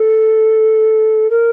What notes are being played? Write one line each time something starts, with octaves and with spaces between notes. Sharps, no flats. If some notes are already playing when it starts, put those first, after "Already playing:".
Already playing: A4
A#4